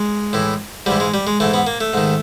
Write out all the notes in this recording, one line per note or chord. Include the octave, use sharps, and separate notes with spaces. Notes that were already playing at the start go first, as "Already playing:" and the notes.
Already playing: G#3
A2 E3
G#2 E3 G3
G#3
G3
G#3
G#2 E3 A3
B3
A#3
A3
G#2 D#3